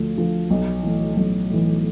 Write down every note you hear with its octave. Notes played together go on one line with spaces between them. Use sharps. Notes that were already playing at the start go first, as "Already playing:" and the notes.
Already playing: D2 D3 F3
D3 F3
B1
A2 E3
B1
A2 E3